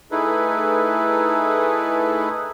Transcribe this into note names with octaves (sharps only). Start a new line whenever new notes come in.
A3 D#4 E4 G#4 A4 B4